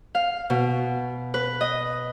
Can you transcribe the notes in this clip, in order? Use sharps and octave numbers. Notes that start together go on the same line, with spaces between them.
F5
B2
B4
D#5